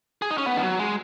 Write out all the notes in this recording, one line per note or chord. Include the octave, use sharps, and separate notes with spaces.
G#4
D#4
C#4
B3
D#3
F#3
G#3